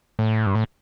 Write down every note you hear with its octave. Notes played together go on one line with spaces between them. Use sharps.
A2
G2
A2